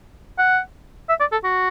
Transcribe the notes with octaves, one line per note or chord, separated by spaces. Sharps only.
F#5
E5
D5
A4
F#4